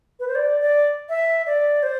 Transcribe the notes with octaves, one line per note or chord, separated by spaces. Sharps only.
B4
C5
D5
D5
E5
D5
C5